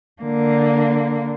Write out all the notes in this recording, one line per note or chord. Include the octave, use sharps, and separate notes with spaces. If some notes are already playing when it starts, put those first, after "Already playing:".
D3 A#3